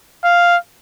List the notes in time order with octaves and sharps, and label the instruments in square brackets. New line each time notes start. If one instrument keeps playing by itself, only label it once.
[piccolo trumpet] F5